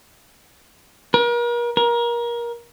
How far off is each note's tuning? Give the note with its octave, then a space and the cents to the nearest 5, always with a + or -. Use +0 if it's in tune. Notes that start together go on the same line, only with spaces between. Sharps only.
A#4 +40
A#4 +25